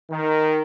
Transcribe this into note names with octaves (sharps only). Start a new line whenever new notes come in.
D#3